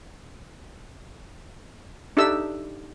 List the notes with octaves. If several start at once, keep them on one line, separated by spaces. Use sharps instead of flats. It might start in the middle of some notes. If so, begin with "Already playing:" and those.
D4 D#4 G4 A4 E5 E6